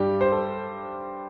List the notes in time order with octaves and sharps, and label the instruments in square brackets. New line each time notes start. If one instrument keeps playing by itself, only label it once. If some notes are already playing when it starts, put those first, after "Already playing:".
Already playing: [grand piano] G2 G3 D4 G4
C5
A4